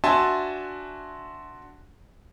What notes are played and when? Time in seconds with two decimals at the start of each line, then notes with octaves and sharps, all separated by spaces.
0.04 D4 F#4 E5 G#5 A5 C6